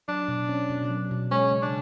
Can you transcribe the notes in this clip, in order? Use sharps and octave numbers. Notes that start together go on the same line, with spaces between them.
F#3 D4
B2
C#4
B2
F#3
B2
G#3 C#4
C#3
D4